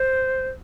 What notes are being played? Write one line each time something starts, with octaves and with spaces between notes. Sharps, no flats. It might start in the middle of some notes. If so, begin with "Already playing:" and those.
Already playing: C5